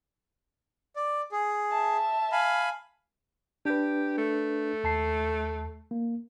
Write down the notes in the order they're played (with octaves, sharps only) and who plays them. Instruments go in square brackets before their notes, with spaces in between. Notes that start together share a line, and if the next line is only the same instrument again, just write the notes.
[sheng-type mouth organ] D5
G#4
[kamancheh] E5 A5
[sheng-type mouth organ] F5 G#5 B5
[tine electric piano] D4 B4 [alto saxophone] G4
[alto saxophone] A3
[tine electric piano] D#2 A5 C7
A#3